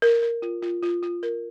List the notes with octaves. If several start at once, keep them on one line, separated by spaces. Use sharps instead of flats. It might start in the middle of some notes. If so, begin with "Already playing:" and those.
A#4
A#4
F4
F4
F4
F4
A#4